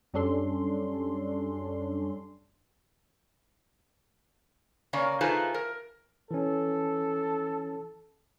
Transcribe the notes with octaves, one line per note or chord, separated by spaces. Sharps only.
F#2 G3 C#4 D4 A4 C6
C#3 A#3 C#4 D5
A3 D#4 F4 G#4 B4 C5
A#4
E3 C#4 A4